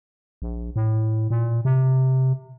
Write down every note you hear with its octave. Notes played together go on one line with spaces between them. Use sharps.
A#1
A2
A#2
C3